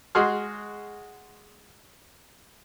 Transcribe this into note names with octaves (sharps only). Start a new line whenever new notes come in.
G#3 F#4 G#4 C6 F6